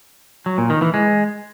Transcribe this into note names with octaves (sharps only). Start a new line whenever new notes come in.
F#3
A#2
D#3
E3
G#3